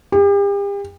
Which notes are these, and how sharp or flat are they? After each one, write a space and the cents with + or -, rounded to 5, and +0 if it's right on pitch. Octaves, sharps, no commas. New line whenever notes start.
G4 +40